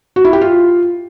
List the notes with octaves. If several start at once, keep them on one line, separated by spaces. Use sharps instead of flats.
F#4
E4
G4
F4